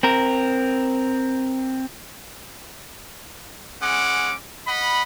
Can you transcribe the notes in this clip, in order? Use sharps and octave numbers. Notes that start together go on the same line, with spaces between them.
C4 A#4
G#3 C#4 F#5 D6
D#5 F#5 B5